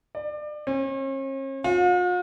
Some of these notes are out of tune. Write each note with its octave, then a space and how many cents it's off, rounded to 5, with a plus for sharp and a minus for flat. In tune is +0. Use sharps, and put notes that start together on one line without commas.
D5 +30
C#4 -45
F4 +45